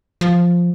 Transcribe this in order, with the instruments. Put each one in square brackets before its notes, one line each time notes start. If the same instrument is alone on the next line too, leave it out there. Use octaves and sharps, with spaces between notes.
[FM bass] F3